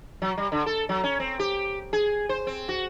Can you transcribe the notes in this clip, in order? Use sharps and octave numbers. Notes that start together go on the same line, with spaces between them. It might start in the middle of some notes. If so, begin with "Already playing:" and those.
F#3
G3
D3
A4
F#3
C#4
C4
G4
G#4
C5
C4
F#4